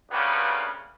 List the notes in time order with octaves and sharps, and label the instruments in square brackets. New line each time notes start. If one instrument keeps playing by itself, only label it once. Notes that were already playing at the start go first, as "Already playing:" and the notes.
[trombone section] D2 C#3 A#3 B3 G4 B4